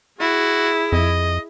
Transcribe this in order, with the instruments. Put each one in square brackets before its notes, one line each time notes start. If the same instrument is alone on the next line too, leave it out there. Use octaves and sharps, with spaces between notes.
[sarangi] E4 [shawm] F#4 [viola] G#4
[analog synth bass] F2 [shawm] D#5